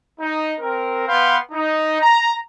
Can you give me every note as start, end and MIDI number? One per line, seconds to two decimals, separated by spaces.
0.20 0.53 63
0.60 1.08 60
0.60 1.08 70
1.08 1.37 59
1.08 1.37 71
1.08 1.37 77
1.08 1.37 79
1.08 1.37 84
1.52 2.00 63
2.01 2.35 82